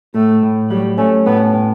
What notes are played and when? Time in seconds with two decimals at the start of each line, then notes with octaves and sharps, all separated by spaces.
0.14 A2 A3
0.43 A2
0.70 F#3 G3
0.98 A3 C#4
1.26 A2 B3
1.54 A2